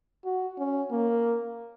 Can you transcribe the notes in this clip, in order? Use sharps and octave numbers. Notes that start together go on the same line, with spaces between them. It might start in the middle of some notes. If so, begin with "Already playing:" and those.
F#4
C#4
A#3